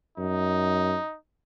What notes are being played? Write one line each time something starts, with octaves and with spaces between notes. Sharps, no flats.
F#2 D#4